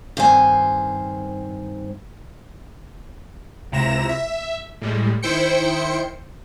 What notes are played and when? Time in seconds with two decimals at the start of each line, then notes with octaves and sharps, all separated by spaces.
0.17 G2 D#3 C4 C5 G#5
3.72 C#2 C3 E4 A#5 A#6 E7
4.09 E5
4.81 A2 G3 G#3
5.22 D#3 E4 C5 G5 C#7